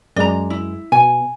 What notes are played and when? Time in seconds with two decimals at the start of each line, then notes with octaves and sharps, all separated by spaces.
0.16 F#2 G#3 D5 A#5
0.50 E4
0.92 B2 G#5